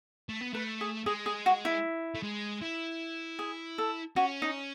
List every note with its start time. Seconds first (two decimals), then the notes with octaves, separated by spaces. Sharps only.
0.29 A3
0.41 B3
0.53 A3 B4
0.81 G#4
1.06 G#3 G#4
1.26 G#4
1.46 F#4
1.65 E4
2.15 A3
2.23 G#3
2.61 E4
3.39 G#4
3.78 A4
4.16 C#4 F#4
4.42 D#4